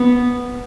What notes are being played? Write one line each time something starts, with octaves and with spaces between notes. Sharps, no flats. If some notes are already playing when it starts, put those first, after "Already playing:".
Already playing: B3